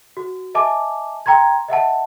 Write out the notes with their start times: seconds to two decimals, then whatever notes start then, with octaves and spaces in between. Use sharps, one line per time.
0.17 F#4
0.54 D#5 E5 G#5 A5 D6
1.26 G5 A#5 C6 G#6
1.68 D#5 E5 F#5 A5